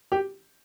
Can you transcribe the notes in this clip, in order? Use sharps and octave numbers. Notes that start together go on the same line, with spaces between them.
G4